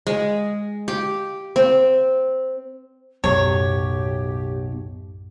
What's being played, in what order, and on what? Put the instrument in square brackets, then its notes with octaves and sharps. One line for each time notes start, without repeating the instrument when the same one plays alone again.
[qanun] G#3
G4
C4
[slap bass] B1 [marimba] F#2 A2 [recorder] G4 [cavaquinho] C#5